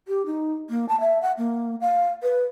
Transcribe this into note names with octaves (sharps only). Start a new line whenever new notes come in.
G4
D#4
A#3
A5
E5
F#5
A#3
F5
B4